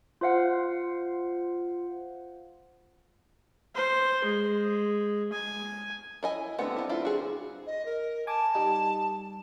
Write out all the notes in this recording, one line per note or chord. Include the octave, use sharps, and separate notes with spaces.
F4 C5 F5 F#5
C5
G#3
G#5
E4 D#5 G#5
D3 G3 A3 B3 C4 F#5
B3 E4
E4 F4
F#4 G#4
D#5
A#4
G#5 A5 D6
G3 D#4